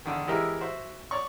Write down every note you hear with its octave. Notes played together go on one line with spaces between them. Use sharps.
E2 D3 D#3
E3 G#3 E4 G4 A#4 D#5
F#4 C5 E5
C#5 D5 C#6